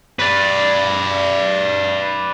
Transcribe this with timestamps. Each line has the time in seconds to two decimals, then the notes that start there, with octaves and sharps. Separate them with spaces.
0.19 B4 D5